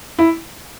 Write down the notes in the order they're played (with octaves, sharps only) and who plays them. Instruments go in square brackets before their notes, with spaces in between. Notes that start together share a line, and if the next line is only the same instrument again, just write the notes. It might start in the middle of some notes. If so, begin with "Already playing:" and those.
[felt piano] E4